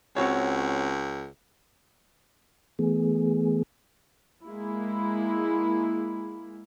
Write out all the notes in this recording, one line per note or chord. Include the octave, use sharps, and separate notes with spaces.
C#2 C4 F#4 C#5
E3 A3 B3 G#4
G#3 A#3 E4